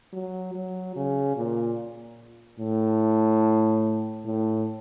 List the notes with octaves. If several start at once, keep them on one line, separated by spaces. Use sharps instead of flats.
F#3
F#3
C#3
A#2
A2
A2